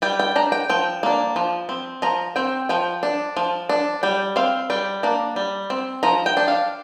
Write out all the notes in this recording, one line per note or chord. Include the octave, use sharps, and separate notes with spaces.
G3 G5
G5
D4 A#5
G5
F3 G5
A#3 D4
F3
C4
F3 A#5
C4 G5
F3 G5
D4
F3
D4
G3 G5
C4 F5
G3 G5
A#3 D4
G3
C4
F3 A#5
G5
D4
F5